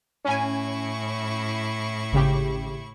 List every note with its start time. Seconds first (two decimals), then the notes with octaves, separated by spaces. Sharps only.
0.25 A2 C#4 E4 G#5 C#6
2.12 G#1 C#3 G4